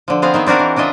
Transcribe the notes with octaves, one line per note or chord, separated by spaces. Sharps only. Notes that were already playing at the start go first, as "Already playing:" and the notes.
D3 F3
B3 C4 G#4 F5
D#3 B3 E5
C4 D4 F#4 A#4 F5
E3
C#3 D4 F4 D#5 E5